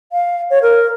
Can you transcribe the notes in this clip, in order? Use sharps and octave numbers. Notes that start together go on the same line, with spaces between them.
F5
C#5
A#4